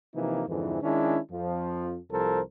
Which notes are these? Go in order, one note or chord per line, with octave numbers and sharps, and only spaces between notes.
C3 E3 F3 A#3 D#4
F2 G#2 D3 E3
D#3 G#3 C#4 D4 E4
F2 F3
C2 F3 A4 A#4 C5